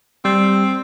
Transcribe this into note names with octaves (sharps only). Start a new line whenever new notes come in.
G3 C4